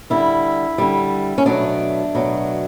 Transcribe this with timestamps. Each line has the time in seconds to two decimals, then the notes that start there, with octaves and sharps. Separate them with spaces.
0.10 D3 G3 E4
0.78 D3 G3
1.38 C#4
1.46 B2 F#3 A3 D4
2.15 B2 F#3 A3